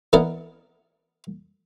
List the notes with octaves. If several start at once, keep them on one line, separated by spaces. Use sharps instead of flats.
E3 B3 A#4 D5 D#5